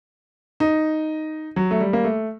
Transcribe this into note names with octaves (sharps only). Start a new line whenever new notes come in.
D#4
F#3
A3
G3
A#3
A3